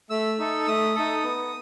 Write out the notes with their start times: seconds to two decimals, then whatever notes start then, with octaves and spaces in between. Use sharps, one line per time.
0.10 A3 E6
0.39 D#4 A4
0.67 A3 D#6
0.95 D#4 A4
1.24 B3